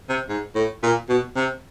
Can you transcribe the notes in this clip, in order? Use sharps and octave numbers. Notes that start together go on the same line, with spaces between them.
C3
G#2
A2
A#2
B2
C3